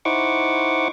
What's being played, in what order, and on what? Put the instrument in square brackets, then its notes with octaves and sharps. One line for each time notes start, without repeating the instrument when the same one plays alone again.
[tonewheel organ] D#4 E4 C5 F#5 C#6 D6